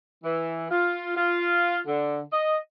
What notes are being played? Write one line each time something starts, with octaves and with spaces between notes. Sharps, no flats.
E3
F4
F4
D3
D#5